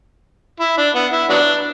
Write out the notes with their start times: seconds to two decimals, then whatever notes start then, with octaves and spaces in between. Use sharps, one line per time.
0.60 E4
0.78 D4
0.95 B3
1.12 E4
1.30 F#3 B3 D4